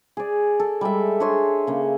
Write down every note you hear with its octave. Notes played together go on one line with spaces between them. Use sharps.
G#4 D5
A4
G3 G#3 A4 E5
D4 G#4 C#5 C6
C#3 A#3